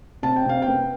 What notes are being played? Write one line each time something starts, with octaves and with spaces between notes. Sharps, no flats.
C3 A5
G5
C3 F5
G5
B3